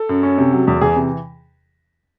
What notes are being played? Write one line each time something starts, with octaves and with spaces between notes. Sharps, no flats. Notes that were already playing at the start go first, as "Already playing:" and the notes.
Already playing: A4
F#2
C#4
C3
F#3
E2
E3 G#4
C3